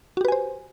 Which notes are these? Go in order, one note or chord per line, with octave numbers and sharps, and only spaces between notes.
F#4 G4 B4 C5 G#5